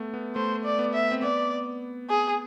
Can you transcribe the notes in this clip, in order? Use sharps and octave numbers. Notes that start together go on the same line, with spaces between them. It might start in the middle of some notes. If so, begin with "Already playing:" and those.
Already playing: A3 B3
B3
A3 C5
D5
B3
E5
C4
B3 D5
G#4